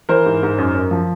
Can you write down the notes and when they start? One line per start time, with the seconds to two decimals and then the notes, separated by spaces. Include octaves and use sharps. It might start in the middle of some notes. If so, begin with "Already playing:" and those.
0.09 E3 A#4 C5
0.26 G#2
0.43 G#2
0.58 F#2
0.74 F#2
0.91 F3